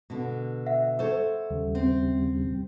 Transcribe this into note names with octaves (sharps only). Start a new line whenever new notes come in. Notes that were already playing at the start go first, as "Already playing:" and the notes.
B2 D3
E5 F#5
A4 C5 C#5
D#2 C#3 G3
C4